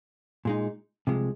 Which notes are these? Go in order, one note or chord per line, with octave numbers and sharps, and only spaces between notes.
A#2 G#3 D#4
C2 C3 F3 G#3